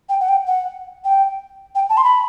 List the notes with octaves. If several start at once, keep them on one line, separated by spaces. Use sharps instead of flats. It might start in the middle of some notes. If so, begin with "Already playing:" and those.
G5
F#5
G5
F#5
G5
G5
A5
C6
B5